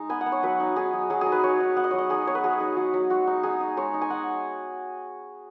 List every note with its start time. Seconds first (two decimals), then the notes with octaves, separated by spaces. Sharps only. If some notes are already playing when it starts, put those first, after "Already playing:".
Already playing: G#3 D#4
0.09 B3 G#5
0.21 F#5
0.26 B3
0.32 C#5
0.43 F#3 B4
0.60 D#4
0.76 D#4 G#4
0.93 F#3
1.10 F#3 G#4
1.21 G#4
1.26 D#4
1.32 B4
1.43 D#4 C#5
1.60 D#4
1.77 B3 F#5
1.84 D#5
1.91 F#3 C#5
1.98 D#5
2.10 D#4 G#4
2.27 B3 C#5
2.35 B4
2.44 F#3 G#4
2.60 D#4
2.77 F#3 F#4
2.94 F#3
3.10 G#3 F#4
3.27 D#4
3.43 D#4 G#4
3.60 D#4
3.77 G#3 C#5
3.94 D#4
4.01 G#5
4.10 D#4 F#5